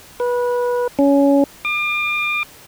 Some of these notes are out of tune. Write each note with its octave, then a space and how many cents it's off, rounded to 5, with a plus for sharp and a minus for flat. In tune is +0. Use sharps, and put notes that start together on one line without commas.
B4 -20
C#4 +20
D6 +40